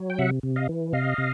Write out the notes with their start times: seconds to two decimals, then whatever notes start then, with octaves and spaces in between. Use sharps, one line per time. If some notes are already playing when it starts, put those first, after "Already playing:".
Already playing: F#3
0.10 G5
0.18 C3 E5 F#5
0.43 C3
0.56 D#5 F5
0.69 E3
0.93 C3 D#5 F5
1.18 C3